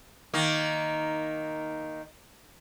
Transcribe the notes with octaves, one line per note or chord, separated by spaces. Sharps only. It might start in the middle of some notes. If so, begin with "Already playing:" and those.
D#3 A#3